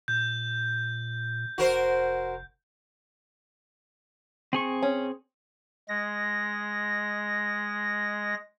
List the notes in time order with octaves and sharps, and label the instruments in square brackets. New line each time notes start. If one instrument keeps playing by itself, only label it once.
[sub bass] A#2 [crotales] G6
[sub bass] F1 [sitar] F#4 A#4 C5
[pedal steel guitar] C4 G#4 C#6
[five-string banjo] C#4
[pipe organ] G#3 A#6